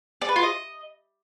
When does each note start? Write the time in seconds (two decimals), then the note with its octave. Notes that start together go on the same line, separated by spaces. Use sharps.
0.21 D5
0.29 B4
0.36 F4
0.43 D#5